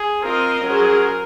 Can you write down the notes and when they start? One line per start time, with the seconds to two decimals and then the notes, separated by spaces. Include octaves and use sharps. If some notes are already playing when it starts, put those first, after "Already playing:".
Already playing: G#4
0.23 C4 F4 A#4 C5 D#5
0.64 F#3 C#4 G#4 C5